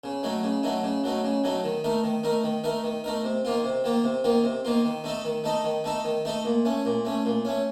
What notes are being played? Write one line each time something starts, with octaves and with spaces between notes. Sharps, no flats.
C#3
F#3 A3 D#4
C#3
F#3 A3 D#4
C#3
F#3 A3 D#4
C#3
F#3 A3 D#4
D#3
A3 D#4 A#4
D#3
A3 D#4 A#4
D#3
A3 D#4 A#4
D#3
A3 D#4 A#4
C3
D#3 A#3 F4
C3
D#3 A#3 F4
C3
D#3 A#3 F4
C3
D#3 A#3 F4
D#3
A3 D#4 A4 D#5
D#3
A3 D#4 A4 D#5
D#3
A3 D#4 A4 D#5
D#3
A3 D#4 A4 D#5
A#2
A3 C#4
A#2
A3 C#4
A#2
A3 C#4